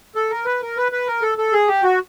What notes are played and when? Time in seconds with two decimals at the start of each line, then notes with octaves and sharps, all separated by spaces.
0.16 A4
0.30 A#4
0.45 B4
0.62 A#4
0.77 B4
0.92 B4
1.07 A#4
1.22 A4
1.38 A4
1.53 G#4
1.68 G4
1.83 F#4